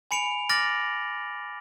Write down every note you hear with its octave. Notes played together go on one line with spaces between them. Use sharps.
G#5 B5 C#7 D7 F7
D6 F6 A6 A#6 D7 F#7